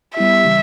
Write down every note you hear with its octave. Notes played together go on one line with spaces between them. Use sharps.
G3 B3 E4 G4 E5
C#3 E3 G3